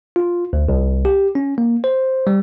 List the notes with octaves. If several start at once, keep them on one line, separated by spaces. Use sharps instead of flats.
F4
D2
C2
G4
C#4
A#3
C5
G3